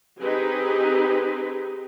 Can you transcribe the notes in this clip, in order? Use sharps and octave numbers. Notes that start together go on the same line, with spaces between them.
C4 D#4 G4 G#4 B4 D#5